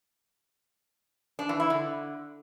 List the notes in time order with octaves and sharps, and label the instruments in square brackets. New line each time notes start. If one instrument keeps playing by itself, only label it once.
[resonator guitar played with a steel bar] D4
E3
E4
D3